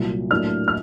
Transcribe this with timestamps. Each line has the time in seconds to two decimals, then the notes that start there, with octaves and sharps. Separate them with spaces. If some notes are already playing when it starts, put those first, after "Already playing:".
Already playing: C2 A#2 F#3
0.31 A2 F#3 A#3 D4 F6
0.68 F6